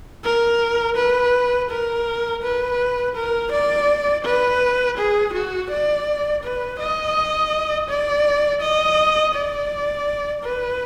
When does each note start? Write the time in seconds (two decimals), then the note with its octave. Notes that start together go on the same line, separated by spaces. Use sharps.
0.24 A#4
0.97 B4
1.70 A#4
2.43 B4
3.16 A#4
3.52 D5
4.25 B4
4.98 G#4
5.33 F#4
5.70 D5
6.44 B4
6.79 D#5
7.89 D5
8.62 D#5
9.35 D5
10.44 B4